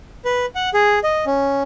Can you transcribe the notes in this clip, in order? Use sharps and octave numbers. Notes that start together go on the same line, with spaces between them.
B4
F#5
G#4
D#5
C#4